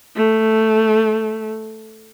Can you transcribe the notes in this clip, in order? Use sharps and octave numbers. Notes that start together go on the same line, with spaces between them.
A3